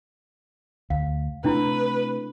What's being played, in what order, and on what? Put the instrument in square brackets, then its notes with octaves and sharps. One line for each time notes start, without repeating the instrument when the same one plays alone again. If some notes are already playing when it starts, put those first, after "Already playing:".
[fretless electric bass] D2 [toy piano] F5
[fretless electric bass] C3 A3 [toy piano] D4 E4 [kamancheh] B4